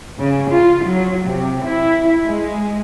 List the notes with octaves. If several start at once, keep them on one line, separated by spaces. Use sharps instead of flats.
C#3
F4
F#3
C3
E4
G#3